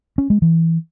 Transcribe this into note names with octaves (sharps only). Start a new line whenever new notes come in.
C#4
G#3
E3